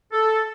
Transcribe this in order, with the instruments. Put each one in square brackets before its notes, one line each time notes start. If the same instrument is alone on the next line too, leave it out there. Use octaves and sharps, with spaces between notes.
[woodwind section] A4